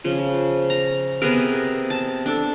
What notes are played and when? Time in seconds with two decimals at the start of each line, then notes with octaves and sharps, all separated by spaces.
0.04 C#3 F3
0.70 A#5
1.22 C3 B3 G#4 A#4
1.90 A5
2.26 D4 A4